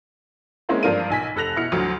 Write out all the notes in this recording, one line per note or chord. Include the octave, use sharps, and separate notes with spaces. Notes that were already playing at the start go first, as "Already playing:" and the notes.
G#3 A#3 C4 C#4 E4 F4
G2 F3 D4 A#4 F5 D#7
B1 G#5 B6
F1 A4 F#6 A#6 F7
B2 E4 F6 C#7
D2 D3 F3 F#3